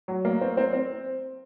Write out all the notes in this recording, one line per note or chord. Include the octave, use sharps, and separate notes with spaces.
F#3
A#3
C4
C4
C4